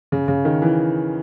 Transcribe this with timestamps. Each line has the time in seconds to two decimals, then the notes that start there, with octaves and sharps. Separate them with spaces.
0.12 C#3
0.28 C#3
0.45 D#3
0.62 E3